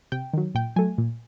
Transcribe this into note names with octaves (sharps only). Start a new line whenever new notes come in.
C3 G5
D#3 F#3
A#2 G5
F#3 A3 G#5
A#2